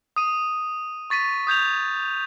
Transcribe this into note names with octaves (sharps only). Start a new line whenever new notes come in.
D#6 D#7
C#6 A6 B6 D#7
D#6 G6 G#6 F7